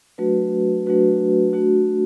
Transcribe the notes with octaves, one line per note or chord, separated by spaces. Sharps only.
F#3 A3 D4 F#4 B4
F#3 A3 D4 F#4 B4
A3 D4 F#4